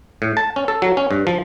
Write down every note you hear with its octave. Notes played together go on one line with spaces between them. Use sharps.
A2
A5
C#4
A4
F#3
C#4
G2
F3